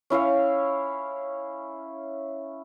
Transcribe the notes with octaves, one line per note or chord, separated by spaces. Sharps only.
C#4 E4 C#5 F5